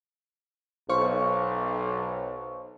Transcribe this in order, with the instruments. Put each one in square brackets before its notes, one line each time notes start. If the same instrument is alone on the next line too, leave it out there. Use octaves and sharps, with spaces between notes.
[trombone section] B1 [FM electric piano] C5 F5 C#6